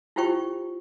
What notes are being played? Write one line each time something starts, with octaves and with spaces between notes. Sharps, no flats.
E4 F4 G4 C5 G5 C#6